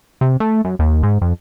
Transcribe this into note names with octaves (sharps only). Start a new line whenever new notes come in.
C3
A3
F#2
D#2
G#2
F2